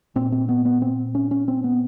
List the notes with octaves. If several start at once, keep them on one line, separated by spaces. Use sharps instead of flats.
A#2 C4
C4
B3
B3
C4
C#4
C#4
C4
B3